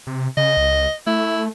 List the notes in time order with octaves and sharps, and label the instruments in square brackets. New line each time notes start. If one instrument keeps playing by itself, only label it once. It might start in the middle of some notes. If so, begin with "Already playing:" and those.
[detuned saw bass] C3
[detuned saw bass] C#3 [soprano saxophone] D#5
[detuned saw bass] C#2
[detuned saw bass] A3 [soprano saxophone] E4